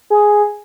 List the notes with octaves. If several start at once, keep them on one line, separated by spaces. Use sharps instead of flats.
G#4